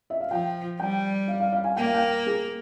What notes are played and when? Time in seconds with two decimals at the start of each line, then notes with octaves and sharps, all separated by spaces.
0.10 E5
0.20 F5
0.30 F3 G5
0.80 G3 G5
1.28 F5
1.40 F5
1.52 F5
1.64 G#5
1.76 A#3 G5
1.86 F5
1.94 G5
2.26 G#4